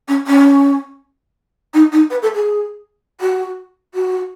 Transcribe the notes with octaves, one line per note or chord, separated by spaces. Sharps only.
C#4
C#4
D#4
D#4
B4
A4
G#4
F#4
F#4